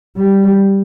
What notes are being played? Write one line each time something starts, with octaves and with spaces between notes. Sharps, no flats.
G3